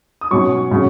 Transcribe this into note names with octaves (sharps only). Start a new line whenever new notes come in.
D#6
B1 B2 F#3 C#4 C#6
C#3 F#3 C#4